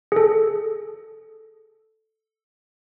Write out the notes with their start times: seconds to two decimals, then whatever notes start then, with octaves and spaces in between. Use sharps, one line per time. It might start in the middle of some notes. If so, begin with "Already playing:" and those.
0.12 G#4 A4